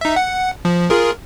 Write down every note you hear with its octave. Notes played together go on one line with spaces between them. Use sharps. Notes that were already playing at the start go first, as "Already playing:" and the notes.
D#4 E5
F#5
F3
F4 G#4 A#4